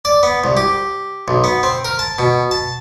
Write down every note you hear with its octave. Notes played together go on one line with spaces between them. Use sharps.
D5
B3
C2
G4
B1
B3
C4
A#4
A5
B2
A5